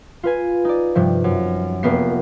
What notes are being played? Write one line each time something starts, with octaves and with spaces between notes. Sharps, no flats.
F4 B4 G#5
D#4 D5
G2 C3 F3
F#2
F1 A#3 B3 C7